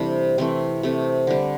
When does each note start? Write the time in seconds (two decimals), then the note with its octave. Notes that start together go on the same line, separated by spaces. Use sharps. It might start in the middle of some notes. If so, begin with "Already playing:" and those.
Already playing: C3 E3 G3 A3 C4 D4
0.38 C3 E3 A3 C4
0.83 C3 A3
1.27 D3 G3